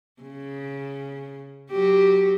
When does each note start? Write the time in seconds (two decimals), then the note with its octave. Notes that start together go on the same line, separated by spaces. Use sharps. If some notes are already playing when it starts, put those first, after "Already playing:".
0.21 C#3
1.71 F#3 F#4 G4